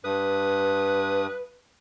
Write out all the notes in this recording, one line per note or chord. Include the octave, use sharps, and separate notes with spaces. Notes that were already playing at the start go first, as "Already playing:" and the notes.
G2 B4 D#6